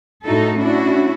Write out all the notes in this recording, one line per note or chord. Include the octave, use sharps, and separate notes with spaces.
A2 D#4 E4 F#4 A4
C#4 D4 E4 F#4